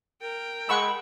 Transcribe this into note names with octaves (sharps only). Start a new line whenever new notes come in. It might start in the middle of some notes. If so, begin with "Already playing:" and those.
A#4 G5
G#3 F#5 B5 C#6 E6